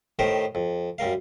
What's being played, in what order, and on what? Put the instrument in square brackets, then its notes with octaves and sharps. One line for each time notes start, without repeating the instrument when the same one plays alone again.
[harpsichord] A2 D#3 G4 A#4 C5
F2
F#2 G3 A#4 F5